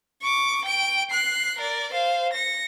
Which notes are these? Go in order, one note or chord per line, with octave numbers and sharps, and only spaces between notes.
C#6 D6
G5 D7
F#6 C7
A#4 D5
C5 F5
A#6 C#7